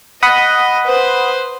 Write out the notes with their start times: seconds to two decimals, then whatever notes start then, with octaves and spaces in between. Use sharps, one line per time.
0.23 D#5 F#5 B5 D#6
0.87 B4 C5